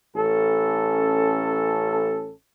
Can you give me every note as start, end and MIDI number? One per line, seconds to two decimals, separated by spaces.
0.15 2.33 33
0.15 2.33 61
0.15 2.33 69